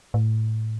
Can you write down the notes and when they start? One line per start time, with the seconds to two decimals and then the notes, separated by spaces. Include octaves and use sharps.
0.14 A2